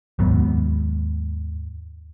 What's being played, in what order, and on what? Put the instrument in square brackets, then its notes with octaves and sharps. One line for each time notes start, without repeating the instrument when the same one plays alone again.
[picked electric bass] D#2 G#2 F#3 B3